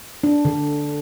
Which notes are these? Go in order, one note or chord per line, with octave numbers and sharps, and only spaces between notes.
D4
D3